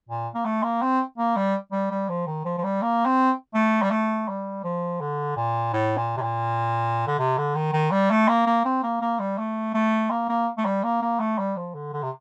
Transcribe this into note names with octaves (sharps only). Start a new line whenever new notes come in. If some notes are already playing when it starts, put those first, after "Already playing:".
A#2
A#3
A3
A#3
C4
A#3
G3
G3
G3
F3
D#3
F3
F3
G3
A#3
C4
A3
G3
A3
G3
F3
D3
A#2
A2
A#2
C3
A#2
D3
C3
D3
D#3
D#3
G3
A3
A#3
A#3
C4
A#3
A#3
G3
A3
A3
A#3
A#3
A3
G3
A#3
A#3
A3
G3
F3
D3
D3
C3